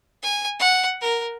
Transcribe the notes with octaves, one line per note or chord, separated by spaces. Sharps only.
G#5
F#5
A#4